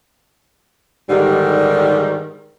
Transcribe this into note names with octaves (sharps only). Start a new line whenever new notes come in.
G#2 D3 D#3 G3